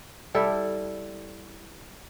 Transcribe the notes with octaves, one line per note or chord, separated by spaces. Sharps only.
G3 E4 A4